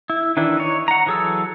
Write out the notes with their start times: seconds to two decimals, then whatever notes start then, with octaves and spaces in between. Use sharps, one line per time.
0.10 E4
0.37 D#3 E3 D4 E4
0.57 D#4 C#5
0.88 F#5 A#5
1.06 E3 F#3 G#4 A4 E6